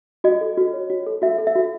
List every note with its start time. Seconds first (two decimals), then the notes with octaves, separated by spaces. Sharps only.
0.24 F#4 D#5
0.41 A4
0.57 F#4
0.73 C#5
0.90 F#4
1.07 A4
1.22 F#4 E5
1.38 A4
1.47 E5
1.55 F#4